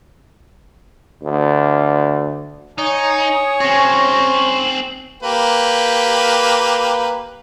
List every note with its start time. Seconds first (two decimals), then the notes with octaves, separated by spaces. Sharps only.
1.23 D2
2.78 D#4 C#5 G#5 D#6
3.60 C4 C#4 G#4 A#6
4.37 F#7
5.23 A#3 G4 B4